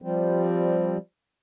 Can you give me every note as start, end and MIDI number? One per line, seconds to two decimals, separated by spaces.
0.02 0.97 53
0.02 0.97 55
0.02 0.97 60